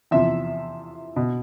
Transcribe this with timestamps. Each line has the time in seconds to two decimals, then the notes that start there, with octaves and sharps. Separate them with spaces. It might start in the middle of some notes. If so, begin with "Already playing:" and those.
0.11 E2 C3 F3 E5
1.16 B2